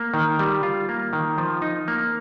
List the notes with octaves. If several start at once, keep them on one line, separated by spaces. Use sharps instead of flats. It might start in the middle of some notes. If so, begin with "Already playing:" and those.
Already playing: A#3
D#3
G3
F4
A#3
D#3
F3
D#4
A#3